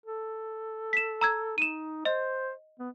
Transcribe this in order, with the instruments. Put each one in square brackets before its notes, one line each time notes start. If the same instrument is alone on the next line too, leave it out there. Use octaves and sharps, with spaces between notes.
[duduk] A4
[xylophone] B6 E7
A#5 E6 G#6
[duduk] D#4 [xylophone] D#7 E7
[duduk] C5 [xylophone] D#5
[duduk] B3